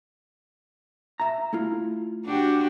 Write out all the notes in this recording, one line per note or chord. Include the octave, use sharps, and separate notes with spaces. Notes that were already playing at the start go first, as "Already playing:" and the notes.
E5 A#5
A3 E4 F4
D4 F#4 G4